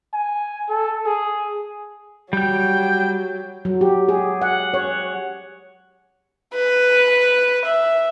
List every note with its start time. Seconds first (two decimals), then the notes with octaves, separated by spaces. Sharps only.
0.13 G#5
0.69 A4
1.06 G#4
2.33 F#3 G3 G5 G6
3.65 F#3
3.81 G4
4.09 G#4
4.42 F#5
4.74 C#5
6.54 B4
7.65 E5